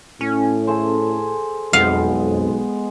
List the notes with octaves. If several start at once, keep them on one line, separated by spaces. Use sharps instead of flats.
A2 C#4
G#4 A4 C5
B1 F2 G#3 B3 F5